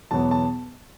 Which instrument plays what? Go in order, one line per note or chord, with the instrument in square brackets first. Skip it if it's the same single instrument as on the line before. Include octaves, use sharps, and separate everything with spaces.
[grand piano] E2 B2 F#3 B3 A5
A5